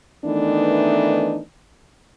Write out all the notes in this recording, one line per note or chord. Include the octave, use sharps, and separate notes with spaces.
D#3 E3 A3 B3 D4 D#4